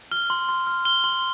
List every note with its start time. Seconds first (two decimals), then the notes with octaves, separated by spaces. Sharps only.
0.11 F6 G7
0.30 C6
0.49 C6
0.67 F6
0.85 F6 G7
1.04 C6